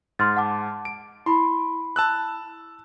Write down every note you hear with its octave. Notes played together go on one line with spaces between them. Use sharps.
G#2 C6 F6 A6
F#5 A5 D6
D7
E4 B5 C6
A5 E6 F#6